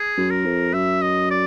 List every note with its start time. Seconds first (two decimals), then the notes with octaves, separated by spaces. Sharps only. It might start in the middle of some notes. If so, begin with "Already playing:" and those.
Already playing: G#4
0.17 F#2
0.30 A#4
0.45 F2
0.73 F#2 E5
1.02 D#5
1.31 D5